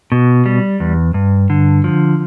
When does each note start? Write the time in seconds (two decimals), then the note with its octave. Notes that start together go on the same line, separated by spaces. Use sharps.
0.12 B2
0.46 G3
0.80 E2
1.14 G2
1.50 D3
1.84 F3